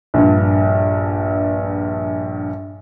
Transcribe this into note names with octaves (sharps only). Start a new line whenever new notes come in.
A#1 G2